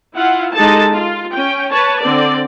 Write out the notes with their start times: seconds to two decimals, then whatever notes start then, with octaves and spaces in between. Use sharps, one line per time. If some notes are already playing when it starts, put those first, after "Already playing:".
0.15 E4 F4 F5 F#5
0.54 G#3 D#4 G4 A4 A5
0.95 F4
1.32 C#4 G5
1.70 B4 C#5 A5
2.01 D3 C4 D5